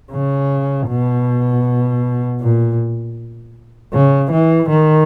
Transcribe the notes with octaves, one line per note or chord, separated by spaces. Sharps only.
C#3
B2
A#2
C#3
E3
D#3